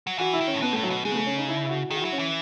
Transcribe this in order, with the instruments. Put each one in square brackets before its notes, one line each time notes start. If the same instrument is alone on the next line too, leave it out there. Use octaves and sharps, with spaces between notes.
[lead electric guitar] F#3
[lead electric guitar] E3 [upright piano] F#4
[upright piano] E4
[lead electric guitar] D#3
[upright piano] C#4
[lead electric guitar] A2
[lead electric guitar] B2 [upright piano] B3
[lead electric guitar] A2 [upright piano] A3
[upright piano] F#3
[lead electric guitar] B2
[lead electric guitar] C#3 [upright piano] G#3
[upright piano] B3
A3
C#4
D#4
E4
E4
F#4
[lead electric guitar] D#3 [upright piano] G#4
[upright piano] F#4
[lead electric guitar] F#3 [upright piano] E4
[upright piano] C#4
[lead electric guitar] E3